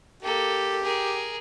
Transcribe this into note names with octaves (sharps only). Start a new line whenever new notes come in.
A#3 G4 A4
G#4 A#4